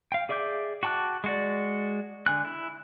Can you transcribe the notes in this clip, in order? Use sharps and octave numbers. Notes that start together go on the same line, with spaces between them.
F5 G5
G#4 D5 E5 D6 G6
F#4 G5 A5 D6 F#6
G#3 F#4 D5
D3 G#5 F#6
E4